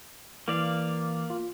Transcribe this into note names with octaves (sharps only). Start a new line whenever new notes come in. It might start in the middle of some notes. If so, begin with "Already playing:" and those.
E3 A#3 D5 F5
F4